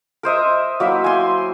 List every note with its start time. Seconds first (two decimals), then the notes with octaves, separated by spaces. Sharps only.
0.23 A#4 C5 D#5 E5
0.80 F#3 A#3 E4 E5
1.04 G#5 C6